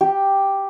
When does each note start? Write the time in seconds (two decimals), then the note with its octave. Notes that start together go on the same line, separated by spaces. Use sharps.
0.01 G4